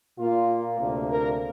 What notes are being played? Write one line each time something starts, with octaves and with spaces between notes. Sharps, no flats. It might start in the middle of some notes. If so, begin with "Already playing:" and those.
A#2 A#3 F4
D2 C3 A#3
A#4